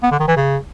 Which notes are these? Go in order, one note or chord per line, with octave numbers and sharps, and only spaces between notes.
B3
D3
D#3
E3
C#3